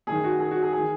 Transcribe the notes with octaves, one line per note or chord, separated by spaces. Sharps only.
F#2 D#3 G#4
F#4
G#4
F#4
G#4
D#3 G#4